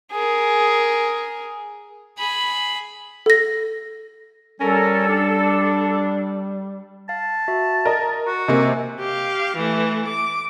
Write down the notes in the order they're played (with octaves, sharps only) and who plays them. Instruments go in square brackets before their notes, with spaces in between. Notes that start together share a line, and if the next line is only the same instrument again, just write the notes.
[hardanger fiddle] G#4 A#4
[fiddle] G#4 B5
[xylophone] A4 A#6
[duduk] G3 [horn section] C#4 A#4 [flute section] A4
[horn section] D4
[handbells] F5 [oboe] A5
[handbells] F#4 E5
[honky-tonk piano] A#4 D#5 [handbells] A#6
[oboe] F#4
[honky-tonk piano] C3 A#3 [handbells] D#5 G#5
[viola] G4 F5
E3 A3
D6